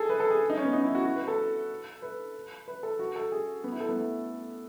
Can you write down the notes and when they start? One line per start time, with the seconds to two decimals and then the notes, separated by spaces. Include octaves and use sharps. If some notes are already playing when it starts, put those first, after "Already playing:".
Already playing: G#4 A4
0.09 B4
0.20 A4
0.30 G#4
0.50 D#4
0.57 C#4
0.65 B3
0.73 D#4
0.84 E4
0.95 F#4
1.05 F#4
1.16 B4
1.28 A4
2.02 B4
2.68 B4
2.83 A4
2.99 F#4
3.16 A4
3.32 G#4
3.64 B3
3.72 E4
3.80 A4
3.89 B3
3.96 A3